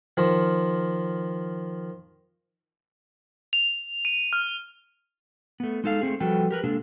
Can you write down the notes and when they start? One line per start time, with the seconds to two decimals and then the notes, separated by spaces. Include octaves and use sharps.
0.17 D#3 F3
3.53 F7
4.05 D#7
4.33 F6
5.60 A3 B3
5.84 G#3 D#4 A4 F5
6.01 A3 C4 G#4
6.20 F3 G3 F#4 A4 B4 G5
6.51 G4 A#4 B4
6.64 C3 G#3 A#3 D4 A4